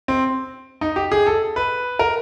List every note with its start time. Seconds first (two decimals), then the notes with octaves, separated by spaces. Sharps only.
0.08 C4
0.81 D#4
0.96 G4
1.12 G#4
1.27 A4
1.56 B4
1.99 A#4